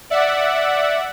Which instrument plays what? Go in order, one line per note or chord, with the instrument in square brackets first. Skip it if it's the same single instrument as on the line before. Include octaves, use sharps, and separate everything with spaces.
[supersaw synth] D5 E5 F#5